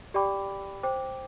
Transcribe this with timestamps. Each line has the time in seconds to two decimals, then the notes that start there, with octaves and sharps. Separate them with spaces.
0.14 G4 D5 G5 B5 D6
0.83 C5 G5 D6